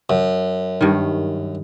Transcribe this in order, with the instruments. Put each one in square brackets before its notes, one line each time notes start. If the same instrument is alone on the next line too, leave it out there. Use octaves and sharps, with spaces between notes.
[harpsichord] F#2
[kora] G2 D#3